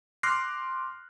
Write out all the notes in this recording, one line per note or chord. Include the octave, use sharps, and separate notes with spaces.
C6 D6 F6 F#6 A#6 C7